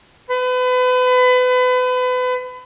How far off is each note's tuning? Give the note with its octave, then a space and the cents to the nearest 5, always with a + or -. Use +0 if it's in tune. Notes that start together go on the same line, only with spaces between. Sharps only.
B4 +35